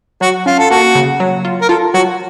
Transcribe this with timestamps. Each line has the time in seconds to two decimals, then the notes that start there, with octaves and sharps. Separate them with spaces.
0.21 F#3 F#4
0.46 C#4 F4
0.59 A4
0.70 A#3 F#4
0.95 C#3
1.20 F#3
1.45 F4
1.61 A#4
1.69 F4 A4
1.94 F#3 F#4